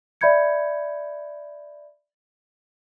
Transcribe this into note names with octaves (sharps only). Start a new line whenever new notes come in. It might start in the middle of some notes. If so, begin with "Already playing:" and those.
D5 E5 B5 G6 G#6 C#7